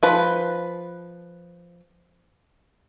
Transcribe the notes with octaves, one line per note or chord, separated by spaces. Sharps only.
F3 B4